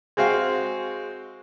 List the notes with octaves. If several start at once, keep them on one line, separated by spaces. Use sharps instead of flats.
G#3 C4 F#4 F5